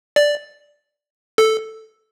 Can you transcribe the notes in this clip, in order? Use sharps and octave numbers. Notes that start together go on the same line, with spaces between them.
D5
A4